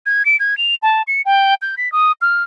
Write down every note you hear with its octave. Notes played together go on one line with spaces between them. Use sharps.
G#6
D7
G#6
F7
A5
C#7
G5
G6
B6
D#6
F6